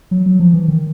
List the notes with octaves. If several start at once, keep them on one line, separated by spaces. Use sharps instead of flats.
F#3
F#3
F3
E3
D#3